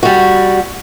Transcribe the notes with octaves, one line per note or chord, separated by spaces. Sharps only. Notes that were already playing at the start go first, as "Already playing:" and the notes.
G3 F#4